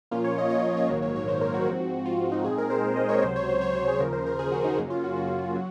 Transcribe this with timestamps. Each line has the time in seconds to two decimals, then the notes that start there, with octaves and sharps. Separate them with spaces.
0.11 A#2 F3 A#3 C#4 F4
0.24 C#5
0.38 D#5
0.50 C#5
0.63 C#5
0.77 C#5
0.89 A#1 G#2 D#3 F#3 A#3 C#5
1.02 C#5
1.16 C#5
1.28 C5
1.41 A#4
1.54 F#4
1.67 G#2 F3 C4
2.06 F4
2.19 F4
2.32 D#4
2.44 A#2 G#3 C4 D#4 G#4
2.58 A#4
2.70 C5
2.96 D#5
3.09 C#5
3.22 C#2 C3 F#3 C5
3.36 C#5
3.49 C5
3.61 C#5
3.74 C5
3.88 G#4
4.00 D#2 C#3 F3 A#4
4.13 C5
4.26 A#4
4.39 G#4
4.52 F#4
4.64 D#4
4.78 F#2 C#3 F#3 A#3 C#4
4.90 F4
5.04 F#4
5.16 F#4
5.55 F#3